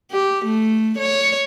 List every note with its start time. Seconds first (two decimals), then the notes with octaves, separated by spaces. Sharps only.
0.11 G4
0.45 A3
0.98 C#5